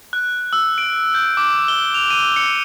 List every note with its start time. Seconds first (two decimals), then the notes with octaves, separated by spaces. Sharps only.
0.13 F#6
0.53 E6
0.78 D7
1.14 G6
1.37 D6
1.68 G7
1.94 F7
2.10 D#7
2.36 C#7